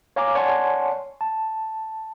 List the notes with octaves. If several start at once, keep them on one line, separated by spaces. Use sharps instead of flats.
C#5 F5 G#5 A#5 D6
C#5 D5 F#5 G#5 A5 C6
A5